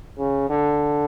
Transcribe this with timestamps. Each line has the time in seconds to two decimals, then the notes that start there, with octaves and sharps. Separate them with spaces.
0.19 C#3
0.50 D3